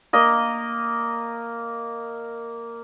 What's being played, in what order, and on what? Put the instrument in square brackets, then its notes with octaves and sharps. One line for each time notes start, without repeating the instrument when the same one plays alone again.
[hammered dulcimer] A#3 D#5